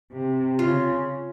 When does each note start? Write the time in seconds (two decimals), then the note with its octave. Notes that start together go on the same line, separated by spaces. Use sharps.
0.12 C3
0.59 C#3 F4